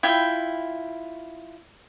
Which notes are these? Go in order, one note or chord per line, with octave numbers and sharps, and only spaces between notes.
E4 F4 G5